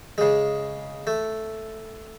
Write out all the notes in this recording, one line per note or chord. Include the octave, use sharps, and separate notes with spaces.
C#3 G#3
A3